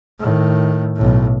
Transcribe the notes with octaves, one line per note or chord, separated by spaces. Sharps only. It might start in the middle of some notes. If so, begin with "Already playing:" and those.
A2 D#3
B1 A2